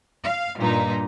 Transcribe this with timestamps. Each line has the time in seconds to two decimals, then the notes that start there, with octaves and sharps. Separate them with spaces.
0.23 F5
0.57 G2 A#2 D#4